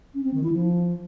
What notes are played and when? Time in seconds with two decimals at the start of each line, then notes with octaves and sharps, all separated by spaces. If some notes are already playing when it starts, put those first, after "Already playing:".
0.14 C#4
0.24 C4
0.34 D#3
0.43 E4
0.53 F3